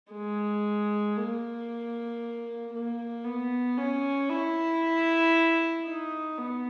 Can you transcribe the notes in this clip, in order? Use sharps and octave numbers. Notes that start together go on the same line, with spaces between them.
G#3
A#3
A#3
B3
C#4
E4
D#4
B3